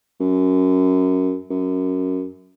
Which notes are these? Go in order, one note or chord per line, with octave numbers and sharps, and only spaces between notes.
F#2
F#2